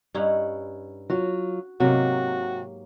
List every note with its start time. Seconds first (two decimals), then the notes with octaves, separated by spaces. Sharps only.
0.14 G2 C#4 D#4 E4 F#5
1.10 F#3 F4 F#4
1.80 G#2 C3 F#3 A#3 F#4